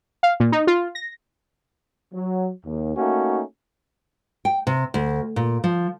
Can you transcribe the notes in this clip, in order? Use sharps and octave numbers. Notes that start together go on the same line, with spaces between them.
F5
A#2
D#4
F4
A#6
F#3
D#2
A3 A#3 C#4 D#4 F#4
G5
C3
D2
A#2
F3